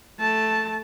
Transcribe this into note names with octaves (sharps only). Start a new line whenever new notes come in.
A3 A5